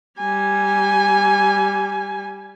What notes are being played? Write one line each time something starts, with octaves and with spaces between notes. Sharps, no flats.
G3 G#5